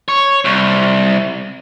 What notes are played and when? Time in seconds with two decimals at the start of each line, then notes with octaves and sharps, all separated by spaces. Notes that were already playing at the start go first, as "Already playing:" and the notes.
0.09 C#5
0.45 C2